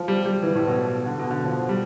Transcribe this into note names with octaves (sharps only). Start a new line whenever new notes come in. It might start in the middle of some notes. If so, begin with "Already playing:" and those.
Already playing: F3
G3
G3
E3
A2
B2
D3
B2
D3
F3
G3